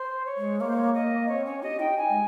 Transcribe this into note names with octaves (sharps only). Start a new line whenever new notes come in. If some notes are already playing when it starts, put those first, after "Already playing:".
Already playing: C5
C#5
G#3
A#3 C#5
C5
C#5
A#3 D#5
C4 C#5
C#4 C#5
G4 D#5
D#4 G5
G#5
G#3